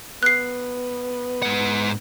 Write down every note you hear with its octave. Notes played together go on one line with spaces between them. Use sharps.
B3 F#6 C7
G#2 F#5